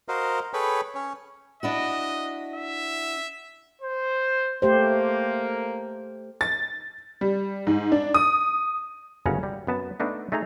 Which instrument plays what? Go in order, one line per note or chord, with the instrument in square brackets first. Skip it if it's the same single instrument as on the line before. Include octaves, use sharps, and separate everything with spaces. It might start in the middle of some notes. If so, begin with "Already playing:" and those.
[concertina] F#4 A#4 C5 D#5 F5
G#4 A4 B4 C#5 G5 B5
C#4 C#5
[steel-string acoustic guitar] D4 E4 F#4 [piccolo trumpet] D#5
[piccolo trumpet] E5
[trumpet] C5
[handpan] A3 G4 C5 [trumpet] A#3
[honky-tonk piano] A6
G3
G#2
D4
D#6
[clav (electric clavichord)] G1 F#2 C#3 C#4 F#5 A#5
G3
F#2 B3 A5
A3 B3 D4 D#4
A3 D#4 G#4 A#5